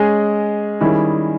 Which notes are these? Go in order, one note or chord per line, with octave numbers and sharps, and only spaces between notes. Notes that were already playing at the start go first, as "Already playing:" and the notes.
Already playing: G#3 C#4 G#4 D#5
D#3 G3 C#4 E4 G#4